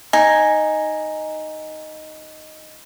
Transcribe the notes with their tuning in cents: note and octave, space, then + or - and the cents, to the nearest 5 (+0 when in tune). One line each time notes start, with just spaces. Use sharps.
D#4 +0 G#5 +0